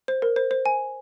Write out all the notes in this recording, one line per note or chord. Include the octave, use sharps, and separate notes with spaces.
C5
A#4
C5
C5
G#5